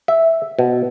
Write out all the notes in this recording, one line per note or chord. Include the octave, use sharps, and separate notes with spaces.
E5
B2